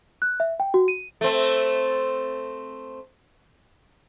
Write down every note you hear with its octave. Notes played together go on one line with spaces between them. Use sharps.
F#6
E5
G5
F#4
D#7
A3 C4